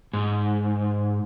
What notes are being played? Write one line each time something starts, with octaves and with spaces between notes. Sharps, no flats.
G#2